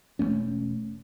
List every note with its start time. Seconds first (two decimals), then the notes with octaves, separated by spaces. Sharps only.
0.19 E1 F#2 A3 C#4